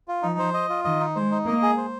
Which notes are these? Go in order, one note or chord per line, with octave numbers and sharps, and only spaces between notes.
F4
F3 D#4
C5
D#5
F4
D#3 D#5
D#4
G#3 C5
D#4
A#3 D#5
G#4
C5